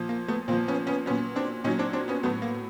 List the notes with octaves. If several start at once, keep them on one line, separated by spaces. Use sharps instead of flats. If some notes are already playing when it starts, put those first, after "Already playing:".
Already playing: A#2 F3
A#3
A3 B3
A#2 F3 A#3 C4
B3 C#4
B3 C#4
A#2 F#3 B3 C#4
C4 D4
A#2 F#3 C#4 D#4
C4 D4
C4 D4
B3 C#4
A2 F#3 A3 B3
A#3